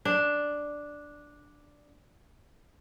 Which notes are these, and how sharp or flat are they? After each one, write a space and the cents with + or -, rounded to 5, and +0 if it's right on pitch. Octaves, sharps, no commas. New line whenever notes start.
D4 +0